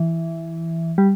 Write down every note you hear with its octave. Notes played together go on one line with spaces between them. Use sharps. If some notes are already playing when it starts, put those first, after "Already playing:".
Already playing: E3
G3